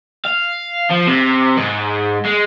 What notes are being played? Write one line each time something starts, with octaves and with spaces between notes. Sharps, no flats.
F5
F3
C3
G#2
G#3